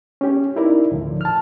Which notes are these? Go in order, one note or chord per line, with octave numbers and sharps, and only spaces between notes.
C#4 G4
D#4 E4 A#4 D5
D2 A2 F3
A5 F6